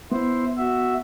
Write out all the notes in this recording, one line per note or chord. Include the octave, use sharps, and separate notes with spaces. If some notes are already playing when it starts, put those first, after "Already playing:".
B3 E4 C5
F#4 E5